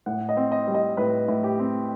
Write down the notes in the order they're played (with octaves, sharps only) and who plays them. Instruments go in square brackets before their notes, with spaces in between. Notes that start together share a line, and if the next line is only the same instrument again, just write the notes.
[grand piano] A2 F#5
D#5
C4
D#5
G3
D#5
A2 B4
A2
G4
C4